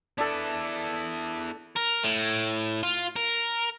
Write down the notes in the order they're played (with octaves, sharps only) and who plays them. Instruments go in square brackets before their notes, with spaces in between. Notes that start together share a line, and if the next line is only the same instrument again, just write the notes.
[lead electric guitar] B3 E4 [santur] D4 A4
[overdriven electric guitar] A#4
A2
F4
A#4